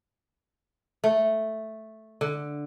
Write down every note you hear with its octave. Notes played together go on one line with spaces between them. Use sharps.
A3
D3